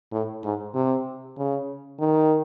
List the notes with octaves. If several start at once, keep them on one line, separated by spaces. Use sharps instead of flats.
A2
G#2
C3
C#3
D#3